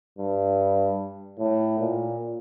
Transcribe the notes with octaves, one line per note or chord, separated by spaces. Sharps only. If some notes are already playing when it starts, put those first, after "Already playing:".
G2
A2
A#2